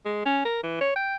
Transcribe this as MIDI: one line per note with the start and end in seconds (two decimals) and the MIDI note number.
0.05 0.22 56
0.25 0.41 61
0.45 0.60 70
0.63 0.80 52
0.81 0.95 73
0.96 1.16 79